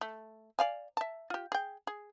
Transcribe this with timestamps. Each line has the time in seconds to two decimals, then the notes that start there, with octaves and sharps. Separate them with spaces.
0.01 A3
0.59 D5 F5 G#5
0.97 E5 A5
1.30 F4 G4
1.52 G#4 G5
1.87 G#4